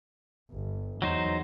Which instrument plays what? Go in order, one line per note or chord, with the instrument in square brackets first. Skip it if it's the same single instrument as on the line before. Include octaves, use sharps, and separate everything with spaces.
[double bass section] G1
[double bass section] E2 [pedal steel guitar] F#3 D#4 C5